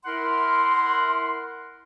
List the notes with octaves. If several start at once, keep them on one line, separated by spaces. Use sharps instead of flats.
E4 A#4 F#5 C6